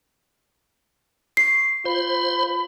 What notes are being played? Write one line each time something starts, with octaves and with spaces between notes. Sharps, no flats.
C#6 C7
F4 C5 B5